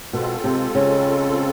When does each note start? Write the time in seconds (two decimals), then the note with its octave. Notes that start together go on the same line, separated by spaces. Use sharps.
0.13 B2 G#3 C4 F4 A4
0.44 C3
0.75 C#3